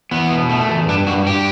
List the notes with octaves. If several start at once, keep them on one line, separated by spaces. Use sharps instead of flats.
E2 B3
B2
A3
E2
G2 D4
G2 F#4
G2 G4